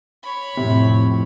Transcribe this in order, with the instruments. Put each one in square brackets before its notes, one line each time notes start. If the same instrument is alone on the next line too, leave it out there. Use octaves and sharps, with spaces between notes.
[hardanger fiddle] C#5 B5
[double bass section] F2 A2 [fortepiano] C3